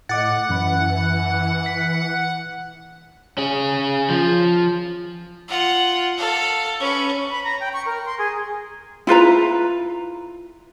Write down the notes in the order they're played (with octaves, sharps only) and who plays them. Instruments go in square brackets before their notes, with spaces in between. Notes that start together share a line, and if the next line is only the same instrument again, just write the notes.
[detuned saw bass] A2 [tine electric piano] D#5 D6 A6 [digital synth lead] F#5
[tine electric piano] F#2 B5 [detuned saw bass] E3
[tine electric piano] B6
[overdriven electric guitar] C#4 G#4
F3
[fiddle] F4 F#5
A4 F5
C#4 B4
[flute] B5
A#5
G5
C#6
A#4
C6
G#4
[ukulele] E4 F4 B4 A#5